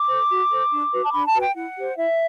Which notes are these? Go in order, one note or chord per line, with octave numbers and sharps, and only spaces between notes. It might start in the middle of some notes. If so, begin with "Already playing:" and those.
Already playing: D6
A4 C5
F#4
A4 C5
D4
F#4 B4
A5
D4 B5
A5
F#4 B4
G5
E4 F#5
G4 C5
E4 E5